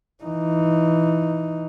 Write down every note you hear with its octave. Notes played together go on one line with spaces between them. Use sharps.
E3 D#4